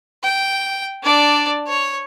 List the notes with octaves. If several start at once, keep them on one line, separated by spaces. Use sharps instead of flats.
G5
D4 D5
C#5